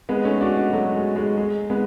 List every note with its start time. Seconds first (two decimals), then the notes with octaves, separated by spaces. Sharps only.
0.09 G#3 B3
0.25 A3 C#4
0.41 D4 F#4
0.57 D4 F#4
0.73 F#3 A3
0.95 G#3
1.16 G#3
1.37 G#3
1.70 G#3 B3